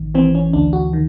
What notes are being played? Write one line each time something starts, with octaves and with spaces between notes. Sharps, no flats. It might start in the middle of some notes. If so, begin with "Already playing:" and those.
Already playing: A1 D#3
E3 C4
C#4
D2 D4
F#4
D#3